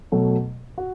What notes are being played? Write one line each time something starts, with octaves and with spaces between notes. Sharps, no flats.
B2 F#3 A3
F#4